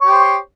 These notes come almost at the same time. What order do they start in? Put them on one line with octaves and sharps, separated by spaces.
C#5 G4 C5